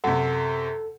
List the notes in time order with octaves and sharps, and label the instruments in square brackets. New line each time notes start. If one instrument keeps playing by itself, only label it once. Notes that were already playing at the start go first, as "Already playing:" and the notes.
[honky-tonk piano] F#2 C3 [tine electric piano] A4 [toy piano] F#5